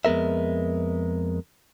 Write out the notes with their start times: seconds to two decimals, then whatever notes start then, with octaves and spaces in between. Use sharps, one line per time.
0.05 F2 G#3 B3 A#4 E5